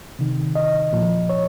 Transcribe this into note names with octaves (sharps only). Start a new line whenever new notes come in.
C3 D#3
D#5
A#2 F3
C#5